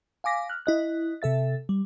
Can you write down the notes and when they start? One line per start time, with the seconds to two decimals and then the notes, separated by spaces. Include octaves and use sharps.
0.24 F5 G#5 D6 A#6 B6
0.50 F6 F#6
0.66 E4 D#5 F#6
1.22 C3 A4 E5 A6
1.69 G3